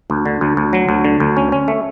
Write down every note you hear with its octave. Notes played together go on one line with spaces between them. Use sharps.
D2
D3
D2
D2
F#3
D2
D3
D2
C#4
C#4
A3